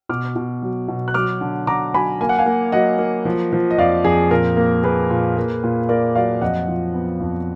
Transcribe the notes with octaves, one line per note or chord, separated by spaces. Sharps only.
B2 D6 F6
B2
F#3
B2
F#6
F#3 D6 F6
D3
D3 A#5 D6
F#3 G#5 B5
A#3 G#5
F#5
F5 G#5
A#3
F#3 D#5 F#5
A#3
F3
F3
D#5
F2 D5 F5
F2 G#4
A#2 A#4
A#3
A#3 G#4 B4
A#2
A#3
A#2
A#3 A#4 D5
F#3 D5 F5
F2 D#5 F#5
F3
B3
F2